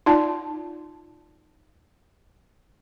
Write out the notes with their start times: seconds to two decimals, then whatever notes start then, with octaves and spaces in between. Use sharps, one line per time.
0.06 D#4 F4 D5 A5